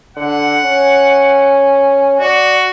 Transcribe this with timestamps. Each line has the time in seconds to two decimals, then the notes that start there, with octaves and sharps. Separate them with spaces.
0.17 D3 F#5
0.64 C#4
2.20 F#4 D5